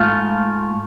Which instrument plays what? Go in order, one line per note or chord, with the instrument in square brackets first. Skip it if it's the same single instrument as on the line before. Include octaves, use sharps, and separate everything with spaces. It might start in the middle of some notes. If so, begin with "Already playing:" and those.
Already playing: [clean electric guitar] G#2 A3 F4 F5